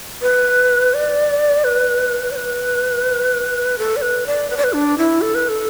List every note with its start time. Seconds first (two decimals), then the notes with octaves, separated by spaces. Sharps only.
0.22 B4
0.94 D5
1.64 B4
2.31 D5
2.36 B4
3.78 A4
3.96 D5
4.02 B4
4.27 D5
4.50 B4
4.57 D5
4.64 B4
4.73 D4
4.98 E4
5.21 A4
5.35 B4
5.49 A4